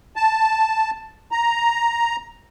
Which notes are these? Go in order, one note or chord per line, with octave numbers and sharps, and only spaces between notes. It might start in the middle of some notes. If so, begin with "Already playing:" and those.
A5
A#5